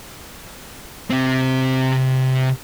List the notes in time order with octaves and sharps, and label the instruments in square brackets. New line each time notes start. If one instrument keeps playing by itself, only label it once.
[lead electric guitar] C3 C4